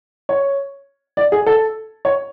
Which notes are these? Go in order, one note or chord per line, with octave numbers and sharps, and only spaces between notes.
C#5
D5
G#4
A4
C#5